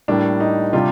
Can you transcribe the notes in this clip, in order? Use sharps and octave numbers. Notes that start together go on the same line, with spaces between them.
A2 G3 A#3 D4
D#4
C3 G3 D4 F4